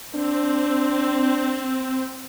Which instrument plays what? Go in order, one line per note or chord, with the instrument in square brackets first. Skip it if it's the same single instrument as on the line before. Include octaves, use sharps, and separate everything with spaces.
[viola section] C4 [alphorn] D4